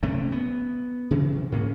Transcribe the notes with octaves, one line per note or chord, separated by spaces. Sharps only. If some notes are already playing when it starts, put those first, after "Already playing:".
C3 A3 C4 C#4
B3
C#3 E3 F#3
C3
G#2 A#3 C#4